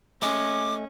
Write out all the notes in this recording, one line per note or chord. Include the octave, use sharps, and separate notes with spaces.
A3 C#4 D#5 G#5 D6